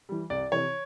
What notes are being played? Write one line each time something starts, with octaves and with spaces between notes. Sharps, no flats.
E3 G3
C2 D5
C3 E3 C#5